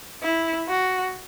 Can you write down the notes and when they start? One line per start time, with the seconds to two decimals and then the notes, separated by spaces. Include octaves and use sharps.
0.22 E4
0.68 F#4